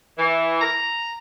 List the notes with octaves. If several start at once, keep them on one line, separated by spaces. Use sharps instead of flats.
E3
A#5